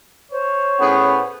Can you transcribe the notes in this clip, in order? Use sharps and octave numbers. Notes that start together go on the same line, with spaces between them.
C5 C#5
A2 B3 C#4 G#4